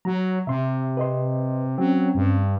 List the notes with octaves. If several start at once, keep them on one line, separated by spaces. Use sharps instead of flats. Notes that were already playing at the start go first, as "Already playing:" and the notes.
F#3 A#5
C3 E5 C6
B4 D#5 C6
F#3 C4 C#4 G5
G2